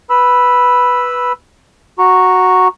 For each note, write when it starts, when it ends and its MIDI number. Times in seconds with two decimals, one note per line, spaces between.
0.10 1.32 71
0.10 1.32 83
0.10 1.32 88
1.99 2.68 66
1.99 2.68 82
1.99 2.68 85